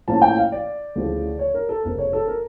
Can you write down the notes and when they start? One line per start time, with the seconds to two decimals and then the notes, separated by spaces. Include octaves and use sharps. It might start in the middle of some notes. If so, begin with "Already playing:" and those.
0.08 A2 F3 A#3 C#4 E4 A5
0.22 G5
0.38 F5
0.52 D5
0.95 D2 C#3 F3 A3 E4
1.39 C#5
1.54 A#4
1.69 A4
1.84 F1 F2 C#3 A#4
1.98 C#5
2.13 A4
2.27 A#4